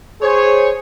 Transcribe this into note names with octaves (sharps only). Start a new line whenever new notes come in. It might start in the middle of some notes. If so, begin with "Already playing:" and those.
G#4 C5 C#5